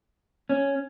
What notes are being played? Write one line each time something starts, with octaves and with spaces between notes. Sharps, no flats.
C#4